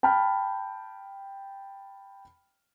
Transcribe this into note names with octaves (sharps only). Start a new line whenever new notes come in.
G5 A5 B5 F6